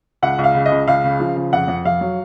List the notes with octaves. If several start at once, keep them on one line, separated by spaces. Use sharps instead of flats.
C#2 F#5
C#2
F5
C#3
D#5
C#2
C#2 F5
C#3
F3
C#3
F2 F#5
F2
F2 F5
F#3